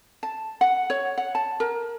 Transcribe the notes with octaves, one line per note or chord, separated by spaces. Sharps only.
A5
F#5
C#5
F#5
A5
A#4